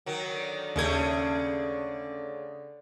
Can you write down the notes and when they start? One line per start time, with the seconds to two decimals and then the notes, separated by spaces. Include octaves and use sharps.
0.06 D#3 F#3
0.34 D3
0.76 D#2 C#3 A3 C#4 G#4 G#6